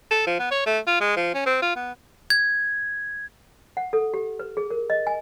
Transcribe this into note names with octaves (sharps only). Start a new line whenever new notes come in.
A4
F3
B3
C#5
A3
F4
G#3
F3
C#4
C4
F4
B3
G#6
F#5
A4
G4
B4
G#4
A#4
D#5
G#5